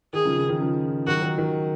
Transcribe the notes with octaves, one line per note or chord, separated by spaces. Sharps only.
D#3 G#4
C#3 F3
C#3
D#3
C#3 F3
D#3 F#3 F#4
D#3
D#3